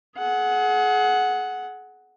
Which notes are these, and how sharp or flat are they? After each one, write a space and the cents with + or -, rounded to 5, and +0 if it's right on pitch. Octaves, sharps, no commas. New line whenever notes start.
G#4 +35 F#5 +0